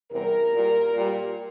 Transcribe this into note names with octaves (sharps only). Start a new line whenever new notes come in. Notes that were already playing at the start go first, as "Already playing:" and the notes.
E2 C3 G3 A#4
A#2 G3
A#2 G3